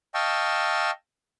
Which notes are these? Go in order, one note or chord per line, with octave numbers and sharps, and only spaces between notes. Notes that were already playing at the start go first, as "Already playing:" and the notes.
D#5 F5 G5 A5 C#6 E6